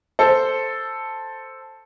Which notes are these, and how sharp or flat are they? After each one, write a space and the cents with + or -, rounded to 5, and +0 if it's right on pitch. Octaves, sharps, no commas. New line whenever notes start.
A4 +0 C5 +0